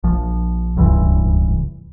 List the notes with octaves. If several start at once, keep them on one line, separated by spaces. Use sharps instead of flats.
A#1 F3
D1 C#2 G2 E3